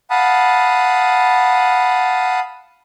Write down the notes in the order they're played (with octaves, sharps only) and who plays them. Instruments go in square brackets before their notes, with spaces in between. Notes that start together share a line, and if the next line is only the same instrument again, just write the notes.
[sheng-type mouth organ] F5 F#5 A5 B5 D#6